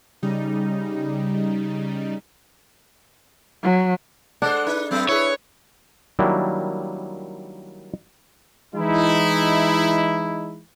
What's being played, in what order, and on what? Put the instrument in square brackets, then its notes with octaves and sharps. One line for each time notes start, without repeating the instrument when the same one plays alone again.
[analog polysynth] C#3 G3 D#4
[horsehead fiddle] F#3
[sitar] G#3 A4 C5 [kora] D4 [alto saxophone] F#5
[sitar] D#4 [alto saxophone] B4
[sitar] F#3 A3 B3 [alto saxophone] C4
[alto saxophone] E4 [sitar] G#4 B4 [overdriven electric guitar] C#5
[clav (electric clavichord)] D#3 F#3 G3 A#3 D4 E4
[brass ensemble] E3 G#3 D#4 E4